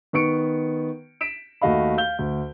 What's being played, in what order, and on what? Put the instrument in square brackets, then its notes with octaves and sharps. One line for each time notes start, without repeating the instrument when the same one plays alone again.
[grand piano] D#3 B3 C#6 C#7 D7
B6 D7 E7
D#2 A3 F#4 D#5 F5 B5
F5 G6 G7
D2